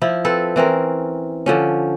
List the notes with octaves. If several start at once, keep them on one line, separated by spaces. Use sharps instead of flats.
F3 E4
C4 A4 B4
E3 C4 C#4 A#4
D3 F3 C#4